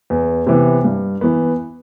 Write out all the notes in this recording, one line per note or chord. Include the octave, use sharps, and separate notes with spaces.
E2
C3 E3 B3
G2
E3 B3